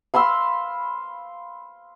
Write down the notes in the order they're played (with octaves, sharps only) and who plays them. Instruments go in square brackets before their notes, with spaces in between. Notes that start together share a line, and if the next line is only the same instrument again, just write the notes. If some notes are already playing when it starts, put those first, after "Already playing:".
[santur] F5 B5 C6 E6